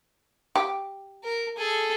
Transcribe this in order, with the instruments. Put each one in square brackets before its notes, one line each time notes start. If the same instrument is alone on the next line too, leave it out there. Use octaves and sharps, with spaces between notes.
[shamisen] G4
[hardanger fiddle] A#4
G#4 A4